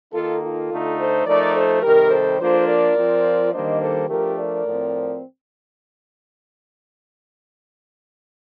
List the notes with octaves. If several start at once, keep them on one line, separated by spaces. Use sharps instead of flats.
D#3 A#3 D#4 F4 A4
F4 A4
D3 A3 D#4
A4 C5
F3 A3 D#4 A#4 D5
A4 C5
C3 D#3 G3 G4 A#4
A4 C5
F3 A#3 D4 F4 A4 C5
A#4 D5
F3 C4 F4
D#3 G3 A#3 D4 C5 D#5
A4 C5
F3 A3 D4 G4 A#4
A#4 D5
A2 F3 C4